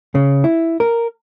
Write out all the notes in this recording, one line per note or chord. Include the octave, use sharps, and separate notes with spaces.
C#3
E4
A#4